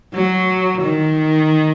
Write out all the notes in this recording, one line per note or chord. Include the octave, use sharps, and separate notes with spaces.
F#3
D#3